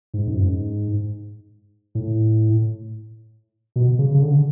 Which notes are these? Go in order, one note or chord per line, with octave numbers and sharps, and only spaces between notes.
G#2
F#2
G#2
A2
B2
C#3
C#3
D3